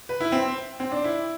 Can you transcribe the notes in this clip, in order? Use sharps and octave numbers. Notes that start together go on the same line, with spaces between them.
B4
E4
C4
C4
D4
E4